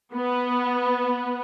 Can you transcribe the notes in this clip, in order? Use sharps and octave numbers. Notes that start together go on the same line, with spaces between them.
B3